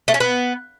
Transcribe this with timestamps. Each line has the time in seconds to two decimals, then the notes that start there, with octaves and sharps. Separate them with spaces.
0.08 A3
0.14 C#4
0.20 B3